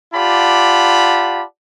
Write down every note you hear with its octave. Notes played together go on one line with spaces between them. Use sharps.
F4 G4 D5 F#5 A5 B5